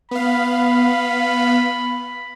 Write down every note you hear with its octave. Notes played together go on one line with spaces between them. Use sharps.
B3 F5 B5